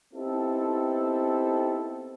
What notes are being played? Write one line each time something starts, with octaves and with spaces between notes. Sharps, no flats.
B3 C4 D#4 E4 G4 A4